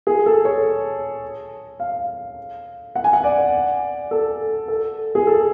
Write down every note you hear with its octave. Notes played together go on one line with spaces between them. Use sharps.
G#4
A4
C#5
F5
F#5
G#5
F#5
D5
A4
A4
G#4
A4